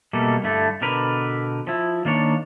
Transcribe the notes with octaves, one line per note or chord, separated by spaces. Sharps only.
B2 G3 A3 A#3
G2 D3 A3 E4
B2 D3 A#4 B4
F3 E4
D#3 A#3 D4 C#5